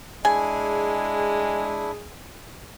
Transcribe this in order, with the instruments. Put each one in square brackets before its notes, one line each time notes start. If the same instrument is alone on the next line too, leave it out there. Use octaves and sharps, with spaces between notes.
[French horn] G#3 [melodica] D4 E4 [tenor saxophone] G#4 [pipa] G#5